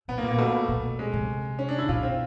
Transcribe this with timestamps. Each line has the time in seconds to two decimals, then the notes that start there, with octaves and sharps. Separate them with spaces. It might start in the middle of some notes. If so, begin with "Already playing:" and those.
0.08 B2 B3
0.18 A#3
0.23 A#2
0.29 A#3
0.38 B2 A3
0.69 B2
0.99 G#3
1.13 C3
1.59 C#4
1.69 D4
1.78 E4
1.89 B2 F4
2.03 C4